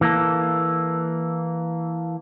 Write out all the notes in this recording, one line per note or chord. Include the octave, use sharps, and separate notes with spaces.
E3 A#3 A4